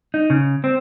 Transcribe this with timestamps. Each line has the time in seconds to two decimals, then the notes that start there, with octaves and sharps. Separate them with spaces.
0.14 D#4
0.30 C#3
0.64 C4